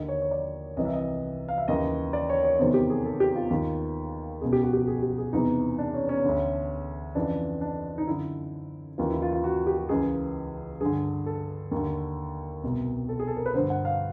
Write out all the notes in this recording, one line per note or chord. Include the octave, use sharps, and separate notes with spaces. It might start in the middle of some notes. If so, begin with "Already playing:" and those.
Already playing: D#2 D3 D#5
C#5
C#5
D5
C2 C3 E3 D#5
E5
D#5
F5
E5
D#2 C#3 E3 D#5
D5
C#5
C#5
E2 C3 D#3 C5
G4
G#4
A4
G4
F4
D#2 D#3 F4
C#2 B2 G#4
G4
F#4
G4
G#4
G4
G#4
E2 C3 E3 D#4
D4
C#4
C#4
D2 D3
F2 C#3 E3 D4
D4
D#4
F#2 D3 E4
D#2 C#3 E3 F4
E4
F4
F4
F#4
G4
C#2 C#3 E3 G#4
G2 D3 G#4
A4
D#2 D3
C2 B2
A4
G#4
A4
A#4
B4
G2 D3 C5
F#5
F5